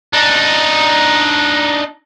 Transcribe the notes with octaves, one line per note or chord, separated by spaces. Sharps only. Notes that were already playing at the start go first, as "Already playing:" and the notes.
D4 D#4